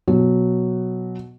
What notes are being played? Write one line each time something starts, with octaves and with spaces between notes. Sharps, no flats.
B2 F#3